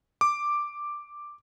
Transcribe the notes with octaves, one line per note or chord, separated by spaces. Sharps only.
D6